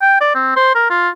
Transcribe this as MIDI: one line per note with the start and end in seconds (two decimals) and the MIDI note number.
0.02 0.16 79
0.21 0.31 74
0.35 0.56 60
0.56 0.71 72
0.75 0.88 70
0.90 1.09 65